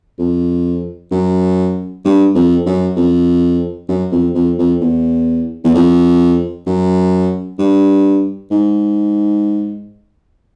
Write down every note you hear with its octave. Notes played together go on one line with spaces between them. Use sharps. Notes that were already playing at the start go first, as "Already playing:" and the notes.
F2
F#2
G2
F2
F#2
F2
F#2
F2
F2
F2
E2
E2
F2
F#2
G2
G#2